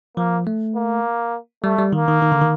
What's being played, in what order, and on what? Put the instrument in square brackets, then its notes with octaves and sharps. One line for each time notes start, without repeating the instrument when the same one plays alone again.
[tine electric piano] F3 [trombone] A#3
[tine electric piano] A3
[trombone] A#3
[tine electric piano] G3 [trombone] A3
[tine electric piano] G3
[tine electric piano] D#3 [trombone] A#3
[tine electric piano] D#3
D#3
D3
D#3